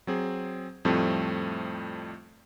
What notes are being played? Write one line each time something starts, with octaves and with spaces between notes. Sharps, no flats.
F#3 C4 G#4
F2 A2 F3 G3 A3 C4